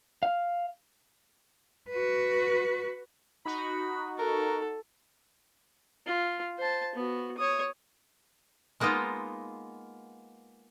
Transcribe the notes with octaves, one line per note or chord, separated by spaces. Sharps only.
F5
F#4 B4
D#4 F#4 B5
A4 A#4
F4
C5 A5
B3 F#4
C#5 D#6
G#3 A#3 B3 D#4 F4